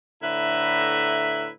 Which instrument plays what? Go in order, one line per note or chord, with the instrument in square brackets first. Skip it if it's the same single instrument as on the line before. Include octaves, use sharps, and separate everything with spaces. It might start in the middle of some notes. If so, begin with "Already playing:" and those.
[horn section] A2 D3 E4 B4 E5 A#5